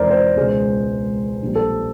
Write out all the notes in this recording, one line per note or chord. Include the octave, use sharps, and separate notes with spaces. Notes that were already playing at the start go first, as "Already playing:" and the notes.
Already playing: E1 E2 C3 D#3 G#3 A#4 C5 D5
C5
C#2 B2 G#3
A#1 A#2 G3
A4